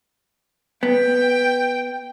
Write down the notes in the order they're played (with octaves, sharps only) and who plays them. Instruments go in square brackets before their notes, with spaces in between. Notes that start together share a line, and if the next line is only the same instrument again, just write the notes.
[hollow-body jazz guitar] B3 [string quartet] G5